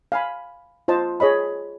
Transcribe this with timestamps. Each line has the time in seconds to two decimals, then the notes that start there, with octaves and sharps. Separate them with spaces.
0.12 F5 G#5 B5
0.88 F4 C5 D#5 A5
1.20 G#4 C#5 D#5 B5